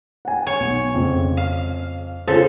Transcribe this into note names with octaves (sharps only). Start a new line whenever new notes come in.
F#5 G#5
C#5
B1
F2 C#3
F5
C#3 F4 A4 C5